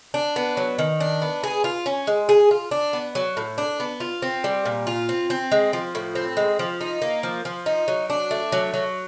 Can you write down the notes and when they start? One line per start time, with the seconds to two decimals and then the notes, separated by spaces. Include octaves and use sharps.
0.14 D4
0.36 B3
0.57 F#3
0.78 D#3
1.00 D4
1.22 B3
1.43 G#4
1.64 F4
1.86 C#4
2.07 G#3
2.29 G#4
2.51 F4
2.71 D4
2.93 B3
3.15 F#3
3.37 A2
3.58 D4
3.80 B3
4.00 F4
4.22 C4
4.44 G3
4.65 A#2
4.87 F4
5.09 C4
5.30 C4
5.51 G#3
5.73 F3
5.95 A2
6.15 C4
6.37 G#3
6.59 F3
6.81 D#4
7.02 A#3
7.23 F3
7.45 F3
7.66 D#4
7.88 F#3
8.10 D4
8.31 A3
8.52 F#3
8.74 F#3